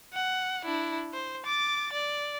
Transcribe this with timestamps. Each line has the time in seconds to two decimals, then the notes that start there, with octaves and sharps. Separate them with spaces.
0.13 F#5
0.65 D4 E4
1.13 C5
1.46 D6 A6
1.93 D5